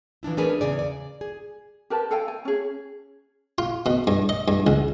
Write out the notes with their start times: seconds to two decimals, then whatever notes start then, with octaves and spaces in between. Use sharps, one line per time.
0.23 E3 F3 D4 E4
0.37 A3 C#4 D4 G#4 A#4 B4
0.61 E2 C#3 G#4 D5
0.79 D5
1.21 G#4
1.90 G4 A#4 B4 A5
2.11 A4 F5 G5 G#5
2.28 G#5
2.45 C#4 G#4
3.58 F4
3.86 B2
4.07 G2
4.29 D#5
4.48 G2
4.67 C#2